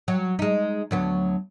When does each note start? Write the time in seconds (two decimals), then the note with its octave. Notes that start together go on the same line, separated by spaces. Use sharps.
0.08 F#3
0.39 G#3 D#4
0.91 D2 F#3 B3